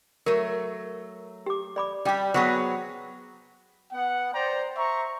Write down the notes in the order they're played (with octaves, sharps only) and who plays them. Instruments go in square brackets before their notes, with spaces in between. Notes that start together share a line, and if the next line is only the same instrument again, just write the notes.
[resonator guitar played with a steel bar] F#3 A3 [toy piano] A#4
[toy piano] G4 D6
D5 B5 D6
[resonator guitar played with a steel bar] G3 G4 [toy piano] D5 G5 D6
[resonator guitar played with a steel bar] F#3 B3 G#4 [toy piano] C5 F#5 C#6
[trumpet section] B3 F#5
C5 D5 G5 A#5
C5 E5 A#5 C#6